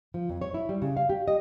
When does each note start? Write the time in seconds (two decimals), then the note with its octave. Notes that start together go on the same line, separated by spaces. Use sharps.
0.14 F3
0.29 F2
0.41 C#5
0.54 E4
0.69 G3
0.82 C#3
0.97 F5
1.09 G4
1.28 D#5